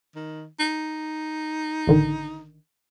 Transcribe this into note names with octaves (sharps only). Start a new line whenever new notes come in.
D#3
D#4
A1 D3 D#3